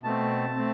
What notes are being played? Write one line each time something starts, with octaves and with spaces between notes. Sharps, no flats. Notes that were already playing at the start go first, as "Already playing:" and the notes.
B2 A3 C4 A5
A3 C4